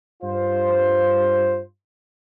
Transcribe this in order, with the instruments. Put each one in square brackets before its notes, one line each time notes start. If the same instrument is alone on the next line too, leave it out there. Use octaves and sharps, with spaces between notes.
[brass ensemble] G2 F4 C5